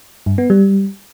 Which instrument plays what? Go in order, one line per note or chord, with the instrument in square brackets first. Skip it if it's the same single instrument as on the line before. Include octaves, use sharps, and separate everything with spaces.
[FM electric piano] G2
B3
G3